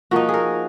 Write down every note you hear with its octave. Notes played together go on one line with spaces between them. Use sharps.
F3 A#3 D#4 F#4
G#4 A#4